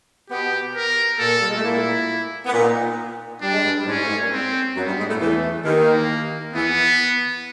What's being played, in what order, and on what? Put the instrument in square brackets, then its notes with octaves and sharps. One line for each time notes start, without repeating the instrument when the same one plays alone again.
[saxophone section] B2 B3 [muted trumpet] G4
[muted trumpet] A#4
[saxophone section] A#2 A#3 [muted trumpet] A4
[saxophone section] G3
G#3
A3
[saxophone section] A#2 A#3 [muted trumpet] E4
[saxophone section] B3
[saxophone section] A#2 A#3 [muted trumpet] D#4
[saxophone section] G3 [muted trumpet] D4
[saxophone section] G#3
G2 G3
G3
[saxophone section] G#2 G#3 [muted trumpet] C#4
[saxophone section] G#2 G#3
A3
G#2 G#3
A#2 A#3
[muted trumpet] C4
[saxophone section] F#2 F#3 [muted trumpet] B3
[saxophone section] G2 G3
G#2 G#3
A2 A3
[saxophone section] E2 E3 [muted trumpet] A3
[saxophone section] D#2 D#3 [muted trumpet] A#3
[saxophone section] E2 E3 [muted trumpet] B3